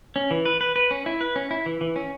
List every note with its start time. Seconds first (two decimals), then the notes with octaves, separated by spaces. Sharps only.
0.16 C#4
0.31 E3
0.45 B4
0.61 B4
0.76 B4
0.91 C#4
1.06 E4
1.21 B4
1.36 C#4
1.51 E4
1.66 E3
1.81 E3
1.96 C#4